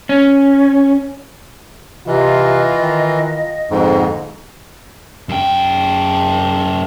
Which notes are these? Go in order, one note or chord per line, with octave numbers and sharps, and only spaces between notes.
C#4
C3 E3 F4 D#5
D#3
A#1 F2 G#2 B2 D3
F#2 G5